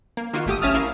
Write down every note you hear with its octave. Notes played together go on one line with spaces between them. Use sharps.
A#3
D#3 A#3 F4 F#4
G1 A3 G4 D#6
A#1 C#4 E5 A5 D#6 F6
E4 A#4 F5